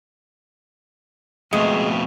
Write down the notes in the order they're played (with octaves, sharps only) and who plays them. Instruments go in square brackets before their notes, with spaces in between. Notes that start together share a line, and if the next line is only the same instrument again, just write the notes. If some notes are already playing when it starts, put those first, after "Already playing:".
[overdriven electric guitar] F2 B2 [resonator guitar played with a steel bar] G#3 [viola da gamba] A3